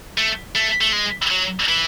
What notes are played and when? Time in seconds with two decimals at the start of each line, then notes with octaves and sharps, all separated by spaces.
0.18 A3
0.55 A3
0.81 A3
0.93 G#3
1.31 F#3
1.69 E3